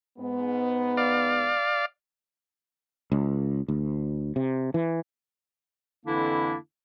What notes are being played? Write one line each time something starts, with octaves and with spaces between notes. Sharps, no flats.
G#2 B3
D5 F5
C#2
D2
C3
E3
F2 D3 E3 A#3 D4 E4